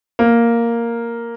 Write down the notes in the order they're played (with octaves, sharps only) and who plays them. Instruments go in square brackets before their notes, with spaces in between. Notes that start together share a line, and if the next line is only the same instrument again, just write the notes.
[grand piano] A#3